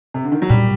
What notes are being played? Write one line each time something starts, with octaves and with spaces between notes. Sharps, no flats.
C3
D3
D#3
F#3
A#2 G3